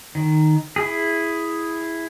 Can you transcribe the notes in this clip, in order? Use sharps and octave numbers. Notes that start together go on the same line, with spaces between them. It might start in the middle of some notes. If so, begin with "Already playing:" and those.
D#3
E4 G#4